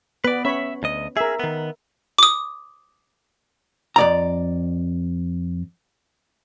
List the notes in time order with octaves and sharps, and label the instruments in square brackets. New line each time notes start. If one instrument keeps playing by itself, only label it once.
[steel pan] B3 [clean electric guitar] B4 D5
[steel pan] C#4 C#5 B5 [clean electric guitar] E5
[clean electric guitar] D2 D#5
[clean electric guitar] G#4 [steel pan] A#4 E5
[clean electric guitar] D#3 B3
[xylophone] D6 D#6
[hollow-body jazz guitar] F2 D5 A#5